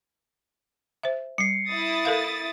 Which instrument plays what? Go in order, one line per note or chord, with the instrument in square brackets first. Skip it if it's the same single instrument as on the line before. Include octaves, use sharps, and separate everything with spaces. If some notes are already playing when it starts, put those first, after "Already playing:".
[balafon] C5 E5
[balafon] G3 [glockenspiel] C7 C#7
[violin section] E4 D#6 A6
[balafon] A4 A#4 F5